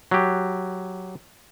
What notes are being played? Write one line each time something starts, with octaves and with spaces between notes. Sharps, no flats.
F#3 G4